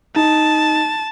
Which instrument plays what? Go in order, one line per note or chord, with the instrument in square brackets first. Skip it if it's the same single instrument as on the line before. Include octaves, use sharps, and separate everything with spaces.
[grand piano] D#4 [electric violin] A5